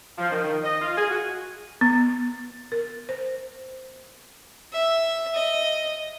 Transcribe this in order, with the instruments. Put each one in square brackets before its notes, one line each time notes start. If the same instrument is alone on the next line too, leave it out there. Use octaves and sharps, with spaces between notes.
[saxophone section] F3
D#3
D#3
D#5
F4
G#4
F#4
[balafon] B3
A#4
C5
[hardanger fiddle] E5
D#5